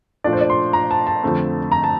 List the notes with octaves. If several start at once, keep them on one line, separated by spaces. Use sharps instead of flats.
A#2 F3 A3 D4 D5
C5
D5
C6
A#5
A5
A5
F2 D3 A3 C4
A#5
A5